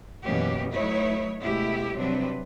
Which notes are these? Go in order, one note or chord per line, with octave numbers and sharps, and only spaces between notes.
F#2 B2 E3 A#3 C#4 G4
F#3 A3 D#4 E4 B4 C#5
D2 B2 G#3 A3 E4 G4
C3 F#3 G3 C4 D4 B4